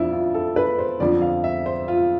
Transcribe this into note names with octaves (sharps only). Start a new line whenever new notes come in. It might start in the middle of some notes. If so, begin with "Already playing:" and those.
Already playing: F2 F3 D4 E4 F4
F4
A4
B4
C5
F2 D3 F3 D5
F5
E5
C5
F4